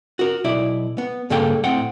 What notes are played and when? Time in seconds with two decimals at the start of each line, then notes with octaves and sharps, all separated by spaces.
0.19 F#4 A#4
0.44 B1 E4 D5
0.98 B3
1.30 G2 C#3 A#3 A4 G5
1.64 A2 C4 F#5 G5